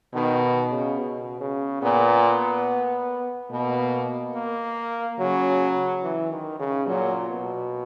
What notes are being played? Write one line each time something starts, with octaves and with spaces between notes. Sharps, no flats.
B2 D#3
C#3
B2
C#3
A#2 B3
B2 A#3
A#3
C#3 F#3
E3
D#3
C#3
A#2 F#3
B2